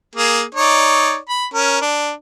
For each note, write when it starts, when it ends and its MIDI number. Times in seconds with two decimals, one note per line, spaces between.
0.15 0.43 58
0.15 0.43 68
0.55 1.17 63
0.55 1.17 73
0.55 1.17 74
1.29 1.45 83
1.54 1.79 61
1.54 1.79 70
1.81 2.11 62